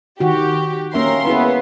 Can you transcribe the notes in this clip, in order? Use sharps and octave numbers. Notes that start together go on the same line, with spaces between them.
D#3 F#4 G4
A#3 C#4 A#4 E5 C6
B3 E4 G#4 B4